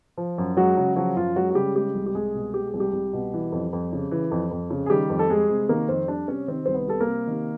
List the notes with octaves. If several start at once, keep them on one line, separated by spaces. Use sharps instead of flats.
F3
F#2
F#3 G#3 F#4
C#3
F3 F#3 F#4
F#2 F4
F#3 G#3 F#4
F#4
C#3 G3 G4
G3 G#3 G4
C2
G4
C2 G#3 G#4
B2
G#3 G4
G#4
C2
G3 G4
C2
B2
E3
F2
F2
C#3
E3
F2
F2
C#3
G#4
D#3 G3 G4
F2
A4
G3 G#3 G#4
C3
D#3 A#3 A#4
F2 C4 C5
G3 D4 D5
C3 C#4 C#5
D#3 C4 C5
C2 C5
B3 B4
G3 A4
A#3 A#4
C3
D#3